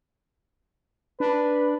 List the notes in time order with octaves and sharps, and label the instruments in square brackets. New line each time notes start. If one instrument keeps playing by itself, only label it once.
[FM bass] D4 [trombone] B4